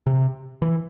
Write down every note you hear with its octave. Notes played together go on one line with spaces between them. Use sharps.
C3
E3